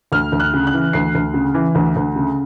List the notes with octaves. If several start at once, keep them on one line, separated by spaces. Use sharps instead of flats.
D2 F6
D2
F#6
C#3
F#6
E3
D2 C7
D2
C#3
E3
D2
D2
C#3